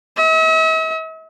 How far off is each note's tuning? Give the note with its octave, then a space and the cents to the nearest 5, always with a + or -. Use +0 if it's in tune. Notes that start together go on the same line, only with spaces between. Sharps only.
E5 -45